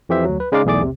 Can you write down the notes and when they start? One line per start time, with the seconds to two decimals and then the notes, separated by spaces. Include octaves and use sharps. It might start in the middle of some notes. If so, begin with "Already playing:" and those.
0.09 F2 E3 G4 C5 E5
0.25 D2 F#3
0.40 B4
0.52 C#3 G#3 D#4 D5 F5 D6
0.65 B1 E2 A3 G#4 D5 D6
0.81 C3